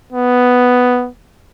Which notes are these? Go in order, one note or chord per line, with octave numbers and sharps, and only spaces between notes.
B3